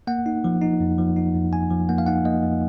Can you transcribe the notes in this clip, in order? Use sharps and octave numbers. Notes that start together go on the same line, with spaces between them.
A#3 F#5
D#4
F3
D#4
F2
F3
D#4
F2
F3 G#5
F3
A#3 F#5
F5
D#4 F#5
A#3 D#5
F2